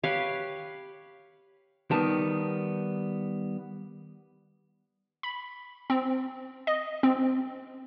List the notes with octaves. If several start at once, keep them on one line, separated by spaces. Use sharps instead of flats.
G4 B4 C#5 F5
D#3 G3 B3 A5
B5
C4
D#5
C4